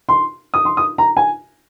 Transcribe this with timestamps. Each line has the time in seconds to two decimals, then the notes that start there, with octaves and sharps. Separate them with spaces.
0.09 C6
0.54 D#6
0.65 C6
0.77 D#6
0.98 A#5
1.17 G#5